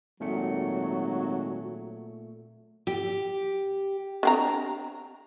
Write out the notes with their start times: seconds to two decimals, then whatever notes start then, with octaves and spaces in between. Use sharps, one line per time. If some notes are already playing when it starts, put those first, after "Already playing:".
0.20 G#1 A#2 F#3 A3 C#7
2.87 G4
4.23 D3 C4 A#5